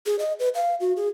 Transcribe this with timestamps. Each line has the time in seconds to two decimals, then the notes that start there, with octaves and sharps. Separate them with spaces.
0.06 G#4
0.19 D#5
0.39 B4
0.55 F5
0.80 F#4
0.96 G#4